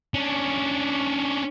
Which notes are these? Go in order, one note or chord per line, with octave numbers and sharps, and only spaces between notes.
C#4 D4